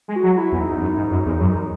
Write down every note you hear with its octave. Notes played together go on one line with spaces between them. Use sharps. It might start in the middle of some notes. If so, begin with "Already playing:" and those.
G#3
F#4
F#3
E4
E2
D#4
E2
F#2
G#2
F#2
E2
F#2